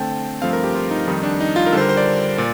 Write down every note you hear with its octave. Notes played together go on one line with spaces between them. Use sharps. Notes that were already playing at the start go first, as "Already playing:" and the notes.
Already playing: D3 A3 C4 G5 A5
G2 F3 A3 C4 F5
A#4
G4
F4
D#4
F2 D#3 G3 D#4
D4
D#4
F4
A#4
D3 G3 D4 A4 C5
A#4
C5
D5
A#2